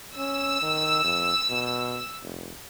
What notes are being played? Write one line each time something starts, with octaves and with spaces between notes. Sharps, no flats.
C#4 E6
D#3
F2
B2
F1